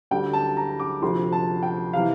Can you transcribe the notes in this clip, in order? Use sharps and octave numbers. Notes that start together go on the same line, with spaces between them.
D2 D3 G3 G5
A5
A#5
D6
D2 C3 F3 C6
A5
G5
C3 E3 F5